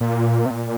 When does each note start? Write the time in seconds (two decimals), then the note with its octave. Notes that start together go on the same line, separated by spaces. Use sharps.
0.01 A#2
0.46 C3
0.50 A#2